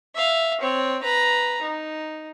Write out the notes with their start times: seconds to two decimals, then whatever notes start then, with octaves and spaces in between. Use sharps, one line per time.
0.15 E5 F5
0.61 C4 C#5
1.02 B4 A#5
1.62 D#4